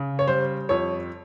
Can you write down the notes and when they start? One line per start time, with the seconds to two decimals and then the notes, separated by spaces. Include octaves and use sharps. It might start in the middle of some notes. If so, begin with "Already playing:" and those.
Already playing: C#3
0.19 C#5
0.27 G3 C5
0.69 F2 C#5